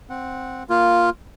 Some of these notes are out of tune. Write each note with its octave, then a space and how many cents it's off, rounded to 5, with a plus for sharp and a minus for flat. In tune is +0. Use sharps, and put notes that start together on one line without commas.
C4 +0 F#5 -10
A#3 +0 F4 +0